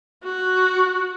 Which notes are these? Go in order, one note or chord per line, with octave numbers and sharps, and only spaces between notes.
F#4